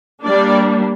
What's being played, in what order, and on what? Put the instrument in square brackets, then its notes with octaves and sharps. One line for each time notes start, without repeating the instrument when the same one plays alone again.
[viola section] G3 A#3 D4 D5